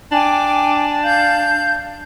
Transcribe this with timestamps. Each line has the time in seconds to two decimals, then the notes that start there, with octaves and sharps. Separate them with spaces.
0.12 D4 G5 G#5 D6
1.03 F5 G6